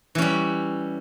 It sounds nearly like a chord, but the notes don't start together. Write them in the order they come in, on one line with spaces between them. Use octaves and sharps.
E3 C#4 G3